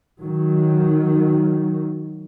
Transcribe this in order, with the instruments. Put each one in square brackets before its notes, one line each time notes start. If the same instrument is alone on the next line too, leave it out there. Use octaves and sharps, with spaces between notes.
[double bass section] D#3 F#3